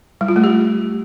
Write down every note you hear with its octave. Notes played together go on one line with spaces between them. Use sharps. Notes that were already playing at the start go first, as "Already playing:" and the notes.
G3
F4
A3
G4